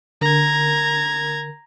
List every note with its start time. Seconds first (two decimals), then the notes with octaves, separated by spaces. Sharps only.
0.21 D3 A#4 A#5 G#6